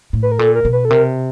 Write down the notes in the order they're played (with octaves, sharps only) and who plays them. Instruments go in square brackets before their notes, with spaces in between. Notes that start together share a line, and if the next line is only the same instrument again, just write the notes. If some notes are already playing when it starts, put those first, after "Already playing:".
[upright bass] A2
[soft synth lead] B4
A#4
[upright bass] A#2 [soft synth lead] A4
[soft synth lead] A#4
[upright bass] B2
[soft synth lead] B4
A4
[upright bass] C3 [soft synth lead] A#4